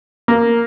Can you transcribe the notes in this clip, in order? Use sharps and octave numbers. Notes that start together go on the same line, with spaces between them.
A#3